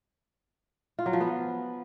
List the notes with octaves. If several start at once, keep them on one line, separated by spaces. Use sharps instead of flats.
F4
F#3
F3
B3